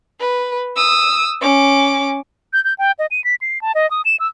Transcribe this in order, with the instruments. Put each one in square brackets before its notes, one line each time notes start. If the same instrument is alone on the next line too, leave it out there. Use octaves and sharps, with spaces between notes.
[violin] B4
D#6 E6
C#4 D6
[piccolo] G6
G6
G5
D#5
D#7
B6
C7
A5
D#5
D#6
E7
E6